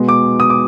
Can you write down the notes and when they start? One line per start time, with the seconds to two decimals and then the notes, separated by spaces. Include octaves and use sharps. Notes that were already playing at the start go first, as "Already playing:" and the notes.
Already playing: B2 G#3 B3
0.08 D6
0.40 D#6
0.50 D6